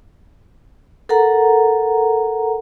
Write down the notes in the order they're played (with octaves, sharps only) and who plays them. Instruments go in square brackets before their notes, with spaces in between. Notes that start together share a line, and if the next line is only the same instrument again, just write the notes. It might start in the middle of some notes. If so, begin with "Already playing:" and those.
[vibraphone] A4 A#4 F#5 A#5